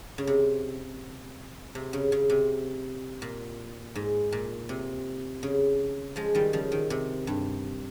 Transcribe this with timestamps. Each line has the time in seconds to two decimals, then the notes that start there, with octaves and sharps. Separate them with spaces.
0.18 C#3
0.27 C3
1.75 C3
1.93 C#3
2.12 C#3
2.30 C3
3.22 A#2
3.95 G#2
4.32 A#2
4.69 C3
5.43 C#3
6.16 F3 G#3
6.35 D#3 G3
6.53 C#3 F3
6.72 D#3
6.90 C3
7.27 G2